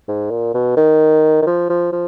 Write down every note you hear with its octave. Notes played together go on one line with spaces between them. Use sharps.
G#2
A#2
B2
D#3
D#3
F3
F3
F3